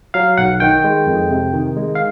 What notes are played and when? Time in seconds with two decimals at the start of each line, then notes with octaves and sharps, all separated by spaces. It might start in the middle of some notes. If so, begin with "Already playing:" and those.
0.14 F#3 F5
0.37 B1 F#5
0.60 D#3 G5
0.84 G#3
1.07 F2
1.31 C3
1.53 D#3
1.77 G#3
1.95 F5